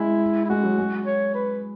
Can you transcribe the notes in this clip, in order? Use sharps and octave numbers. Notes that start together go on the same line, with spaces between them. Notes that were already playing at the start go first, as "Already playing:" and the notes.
Already playing: G#3 E4
E4
G#3 F#4
F#3
G#3
C#5
B4